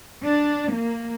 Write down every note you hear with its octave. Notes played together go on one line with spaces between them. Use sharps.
D4
A#3